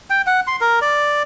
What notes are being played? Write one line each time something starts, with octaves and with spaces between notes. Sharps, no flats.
G5
F#5
C6
A#4
D5